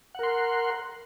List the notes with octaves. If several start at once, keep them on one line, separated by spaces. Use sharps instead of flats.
A#4 F#5 C6